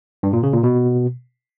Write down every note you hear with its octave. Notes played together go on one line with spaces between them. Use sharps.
G2
A#2
C#3
A#2
B2